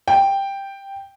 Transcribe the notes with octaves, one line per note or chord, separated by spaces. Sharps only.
G5